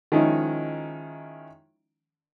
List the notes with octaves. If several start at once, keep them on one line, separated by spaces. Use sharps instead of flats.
D#3 F3 G#3 C#4 D#4 E4